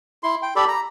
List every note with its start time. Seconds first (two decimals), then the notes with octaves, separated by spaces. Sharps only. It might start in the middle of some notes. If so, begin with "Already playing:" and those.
0.23 E4 C6
0.42 G5
0.56 G4 A4 D5 B5
0.68 A#5